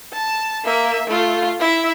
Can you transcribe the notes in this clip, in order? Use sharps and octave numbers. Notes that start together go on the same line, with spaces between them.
A5
A#3 E5
A3 F4
E4 E5